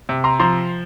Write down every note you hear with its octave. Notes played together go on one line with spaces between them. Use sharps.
C3
A#5 C6
F3 A#5 C6